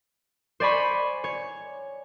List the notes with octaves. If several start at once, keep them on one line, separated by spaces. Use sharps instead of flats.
C5 D5 G#5 B5 C#6
C#5